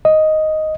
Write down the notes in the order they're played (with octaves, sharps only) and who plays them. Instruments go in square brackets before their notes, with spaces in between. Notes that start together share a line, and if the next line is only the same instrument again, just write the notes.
[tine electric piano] D#5